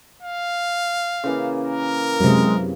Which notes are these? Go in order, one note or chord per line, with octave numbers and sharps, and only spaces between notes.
F5
C#3 E3 A#3
A#4
F#2 C3 G#3